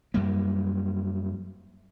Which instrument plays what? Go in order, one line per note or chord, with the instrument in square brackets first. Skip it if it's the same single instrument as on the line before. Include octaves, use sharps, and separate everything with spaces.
[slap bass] F#2 G3 A#3